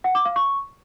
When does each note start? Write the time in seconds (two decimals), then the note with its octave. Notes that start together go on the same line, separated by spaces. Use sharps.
0.04 F#5
0.15 D6
0.25 F5
0.36 C#6